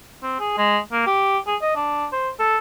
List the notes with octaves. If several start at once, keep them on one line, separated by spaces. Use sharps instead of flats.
C4
G#4
G#3
A#3
G4
G#4
D#5
D4
C5
A4